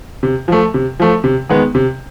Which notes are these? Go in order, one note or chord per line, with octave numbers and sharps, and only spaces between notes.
C3
F3 A3
C3
F3 A3
C3
D#3 G#3 B3
C3